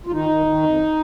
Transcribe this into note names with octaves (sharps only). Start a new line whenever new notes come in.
F4
D#3 D#4
D#3
D#3
F2